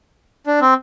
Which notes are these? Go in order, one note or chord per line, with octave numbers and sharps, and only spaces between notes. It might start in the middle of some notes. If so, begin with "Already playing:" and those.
D4
C4